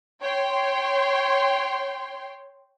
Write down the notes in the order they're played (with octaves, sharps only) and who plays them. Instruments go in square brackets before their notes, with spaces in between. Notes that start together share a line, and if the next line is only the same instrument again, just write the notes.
[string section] C#5 G5 C6